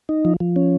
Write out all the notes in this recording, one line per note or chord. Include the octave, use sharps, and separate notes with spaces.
D#4
F3
F3
C#4